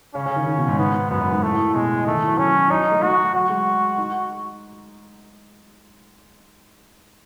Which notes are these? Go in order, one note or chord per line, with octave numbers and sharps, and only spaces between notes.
C#3 C#4
C#3
D#3
D#3
B2
G#2
G#2 B3
F#2 B3
F#2
G#2
A2 A3
E3
B2 G#3
D#3 A3
E3
F#3
F#3 C#4
E3
F#3 D#4
A3
A3 F#4
F#3 F#4
G#3
D#4